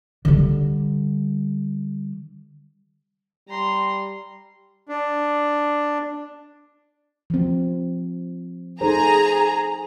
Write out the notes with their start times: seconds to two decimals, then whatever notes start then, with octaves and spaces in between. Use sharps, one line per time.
0.25 D3 G3
3.49 G3 A#5 C6
4.89 D4
7.30 F3 C4
8.81 D#4 G#4 A4 C5 A#5